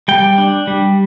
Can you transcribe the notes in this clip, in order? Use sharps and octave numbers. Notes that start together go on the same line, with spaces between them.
G3 G5
D4
G3